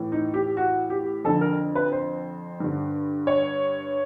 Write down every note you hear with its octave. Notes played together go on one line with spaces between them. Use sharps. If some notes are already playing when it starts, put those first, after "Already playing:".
Already playing: A2 E3
D#4
G4
F#4
G4
F2 D3 A4
A#4
B4
C5
G2 D3
C#5